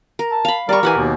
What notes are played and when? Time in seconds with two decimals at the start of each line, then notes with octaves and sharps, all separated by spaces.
0.19 A#4
0.32 A5
0.45 F5 B5
0.69 G3 A#4 D5 C#6
0.83 E3 G4 F#5 G#5
0.96 D#2 B2